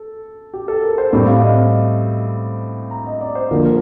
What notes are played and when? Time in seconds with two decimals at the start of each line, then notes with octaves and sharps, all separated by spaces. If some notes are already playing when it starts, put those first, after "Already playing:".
Already playing: A4
0.54 G4
0.68 A4
0.83 A#4
0.98 C5
1.13 A2 G3 C4 D5
1.27 F5
1.42 D#5
2.91 A#5
3.07 D#5
3.21 D5
3.35 C5
3.51 D3 F3 A#3 A#4
3.65 A#4